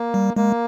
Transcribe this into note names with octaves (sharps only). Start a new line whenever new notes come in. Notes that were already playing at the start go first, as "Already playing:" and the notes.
Already playing: A#3
G3
G#3 A#3